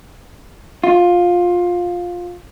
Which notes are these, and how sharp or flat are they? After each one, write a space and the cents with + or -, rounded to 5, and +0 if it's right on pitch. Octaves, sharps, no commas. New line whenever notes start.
F4 +15